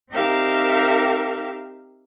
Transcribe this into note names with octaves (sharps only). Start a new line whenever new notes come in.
C4 D#4 G4 A#4 E5 F5